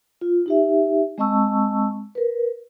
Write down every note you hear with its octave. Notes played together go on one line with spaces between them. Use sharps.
F4
D#4 G4 E5
G#3 C4 D#5 A5 C#6 E6
A#4 B4